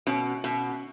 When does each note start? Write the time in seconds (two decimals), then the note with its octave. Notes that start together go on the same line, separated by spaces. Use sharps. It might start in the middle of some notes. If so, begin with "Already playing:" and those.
0.07 B2 C#4
0.44 B2